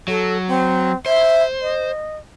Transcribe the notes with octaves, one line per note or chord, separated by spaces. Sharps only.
F#3 A4
C4
C5 E5
D#5